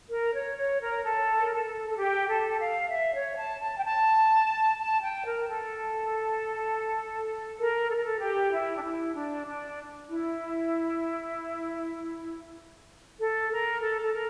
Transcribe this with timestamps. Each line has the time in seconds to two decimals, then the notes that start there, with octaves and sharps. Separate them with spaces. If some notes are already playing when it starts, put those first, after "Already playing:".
0.10 A#4
0.33 C#5
0.57 C#5
0.80 A#4
1.03 A4
1.39 A#4
1.51 A4
1.89 A4
1.98 G4
2.28 A4
2.60 F5
2.90 E5
3.14 C#5
3.37 A5
3.61 A5
3.77 G5
3.85 A5
4.78 A5
5.02 G5
5.25 A#4
5.49 A4
7.59 A#4
7.89 A4
7.97 A#4
8.04 A4
8.20 G4
8.53 E4
8.76 D4
8.84 E4
9.15 D4
9.46 D4
10.09 E4
13.20 A4
13.51 A#4
13.82 A4
14.02 A4
14.13 A#4